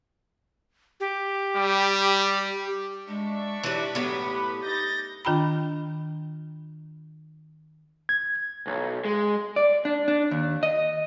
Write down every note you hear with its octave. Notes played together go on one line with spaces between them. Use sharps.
G4
G3
G#3 D4 D5 E5 C#6
E3 F#3 G4
A2 F#3 B3
B4
D#4 G6 A6 A#6
D#3 D4 F4 G5 A#5 B5
G#6
B1
G#3
D5
D4
D4
D#2
D#5